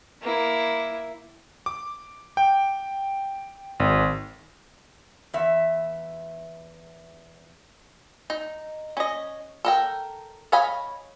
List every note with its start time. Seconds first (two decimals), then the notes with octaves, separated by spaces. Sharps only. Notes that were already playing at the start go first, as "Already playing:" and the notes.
0.23 A#3 E4
1.66 D6
2.37 G5
3.80 G#1
5.34 E2 E5
8.30 D#4
8.97 C#4 D#5
9.65 A4 A#4 G5
10.52 C#5 D#5 F5 G#5 B5